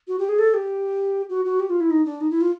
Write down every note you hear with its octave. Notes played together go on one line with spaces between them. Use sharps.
F#4
G4
G#4
A4
G4
F#4
F#4
G4
F4
E4
D#4
D4
D#4
E4
F4